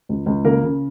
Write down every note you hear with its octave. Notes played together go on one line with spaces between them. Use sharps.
C#2
C#2
C#3 A#3 A#4
C#3